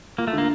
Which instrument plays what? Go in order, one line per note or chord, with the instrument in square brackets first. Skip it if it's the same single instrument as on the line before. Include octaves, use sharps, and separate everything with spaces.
[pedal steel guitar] A#3 [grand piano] F4
[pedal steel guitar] A3
[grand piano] D3 [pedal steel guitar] A#3